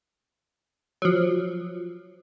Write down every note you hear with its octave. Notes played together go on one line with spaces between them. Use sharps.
F3 F#3